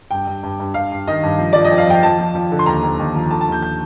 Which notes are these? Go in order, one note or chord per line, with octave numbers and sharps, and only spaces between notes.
G2 G5
G2
G2
G2
G2 F5
G2
D#3 D#5
G2
F3
F3 D5
D#5
F2
F5
F3 G5
F3 A5
F3
F3
D3
C6
D#2 A#5
D#2
D#2
F3
D3 A5
A5
D#2
G6
G6